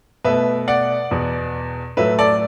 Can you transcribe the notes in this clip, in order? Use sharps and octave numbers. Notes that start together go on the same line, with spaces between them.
B2 A3 B4 E5
D5 F#5
E2 B2 B3
A2 F#3 A3 B4 E5
A4 D5